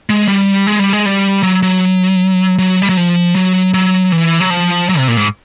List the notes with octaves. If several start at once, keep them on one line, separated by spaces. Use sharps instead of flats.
G#3
G3
G#3
G3
G#3
G3
F#3
F#3
F#3
G3
F#3
F3
F#3
F#3
E3
F#3
F3
F#3
C3
A#2
G#2